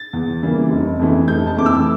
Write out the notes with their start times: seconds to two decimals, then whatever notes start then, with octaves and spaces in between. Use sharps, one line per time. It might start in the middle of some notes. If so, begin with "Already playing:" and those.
Already playing: A6
0.13 E2
0.42 C#3 E3 G3 A#3
0.70 F1
0.99 F2 E3 A3
1.28 F1 G6
1.47 A5
1.57 F2 E3 A3 D6
1.66 E6